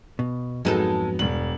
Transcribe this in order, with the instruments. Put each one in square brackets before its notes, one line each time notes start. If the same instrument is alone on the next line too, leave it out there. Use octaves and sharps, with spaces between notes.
[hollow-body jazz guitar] B2
[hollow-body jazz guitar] F2 G#2 [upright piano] F#3 B3 [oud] G#3 D#4 A4
[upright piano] E1 F#7 [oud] G2